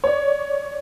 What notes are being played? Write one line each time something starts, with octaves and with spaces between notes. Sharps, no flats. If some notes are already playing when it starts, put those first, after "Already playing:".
C#5 D5